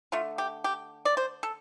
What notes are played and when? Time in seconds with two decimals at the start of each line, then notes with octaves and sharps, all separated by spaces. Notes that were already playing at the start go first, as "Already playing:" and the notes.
0.12 D3 A3 F4
0.38 G4
0.64 G4
1.05 D5
1.17 C5
1.43 A4